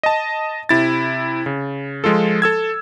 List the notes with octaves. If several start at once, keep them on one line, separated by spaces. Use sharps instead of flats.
D#5 A5
C3 E4 A6
C#3
F3 G#3 F4 A4
A4 E6 G#6